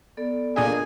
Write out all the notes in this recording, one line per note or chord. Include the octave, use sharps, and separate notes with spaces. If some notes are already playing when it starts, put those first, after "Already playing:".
B3 A4 D5
A#2 D4 G#4 D#5 G#5